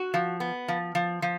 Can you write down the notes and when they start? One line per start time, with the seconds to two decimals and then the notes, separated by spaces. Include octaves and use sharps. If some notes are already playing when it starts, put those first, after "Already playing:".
Already playing: F#4
0.14 F3
0.40 B3
0.68 F3
0.95 F3
1.22 F3